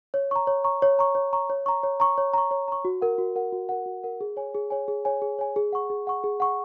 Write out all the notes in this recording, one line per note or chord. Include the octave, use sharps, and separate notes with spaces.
C#5
A#5 C#6
C#5
A#5 C#6
C#5
A#5 C#6
C#5
A#5 C#6
C#5
A#5 C#6
C#5
A#5 C#6
C#5
A#5 C#6
C#5
A#5 C#6
F#4
A#4 F#5
F#4
A#4 F#5
F#4
A#4 F#5
F#4
A#4 F#5
G#4
C#5 G#5
G#4
C#5 G#5
G#4
C#5 G#5
G#4
C#5 G#5
G#4
F#5 C#6
G#4
F#5 C#6
G#4
F#5 C#6